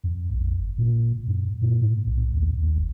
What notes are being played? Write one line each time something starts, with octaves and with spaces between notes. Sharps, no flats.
F2
A#1
G1
A#2
F#2
A#2
A2
B1
D#2
D#2
F#1